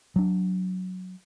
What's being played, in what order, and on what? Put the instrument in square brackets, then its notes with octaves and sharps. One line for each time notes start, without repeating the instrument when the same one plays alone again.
[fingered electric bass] F#3 D4